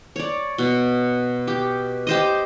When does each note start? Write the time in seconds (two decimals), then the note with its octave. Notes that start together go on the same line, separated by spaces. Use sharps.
0.16 C#5 D5
0.58 B2
1.47 G4
2.07 G4 C5 D#5